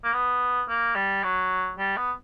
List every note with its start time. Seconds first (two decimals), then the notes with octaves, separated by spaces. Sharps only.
0.04 A#3
0.13 B3
0.69 A#3
0.96 G3
1.23 F#3
1.79 G3
1.97 B3